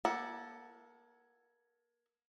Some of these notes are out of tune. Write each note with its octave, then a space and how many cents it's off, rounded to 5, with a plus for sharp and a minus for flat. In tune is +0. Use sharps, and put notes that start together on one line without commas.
A#3 +30 A4 +0 F#5 +5